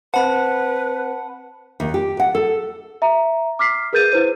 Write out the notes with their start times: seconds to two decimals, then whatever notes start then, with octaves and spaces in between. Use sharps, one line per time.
0.14 C4 B4 C5 F#5 A5 B5
1.80 D#2
1.94 G4
2.20 F#5
2.35 A4
3.02 E5 A#5
3.59 D6 F6 B6 C7
3.93 G#4 A#4 B4 G6 A6 D#7
4.12 E4 B4 C5 D#7